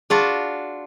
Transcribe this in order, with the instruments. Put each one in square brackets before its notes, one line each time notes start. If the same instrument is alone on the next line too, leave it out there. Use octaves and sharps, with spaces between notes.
[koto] D4 F4 F#4 [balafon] G#4 A5